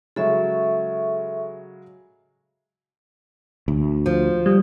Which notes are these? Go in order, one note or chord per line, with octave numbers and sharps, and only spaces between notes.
C#3 F#3 G#3 A4 E5 C#6
D2
F3
G3